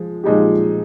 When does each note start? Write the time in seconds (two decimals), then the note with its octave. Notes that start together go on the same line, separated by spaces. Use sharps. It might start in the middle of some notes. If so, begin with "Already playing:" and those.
Already playing: F3 G#3
0.24 A#2 F3 G#3 D#4 G4